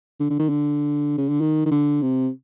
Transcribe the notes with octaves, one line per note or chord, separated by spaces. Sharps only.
D3
D3
D#3
D3
C#3
D3
D#3
D#3
D3
C3